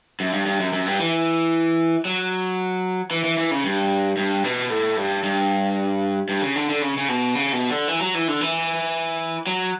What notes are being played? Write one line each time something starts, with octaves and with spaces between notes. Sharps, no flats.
F#2
G2
G2
F#2
F#2
G2
E3
F#3
E3
E3
E3
C#3
G2
G2
B2
A2
G2
G2
G2
C#3
D3
D3
C#3
C#3
B2
C#3
B2
D3
E3
F#3
E3
D3
E3
F#3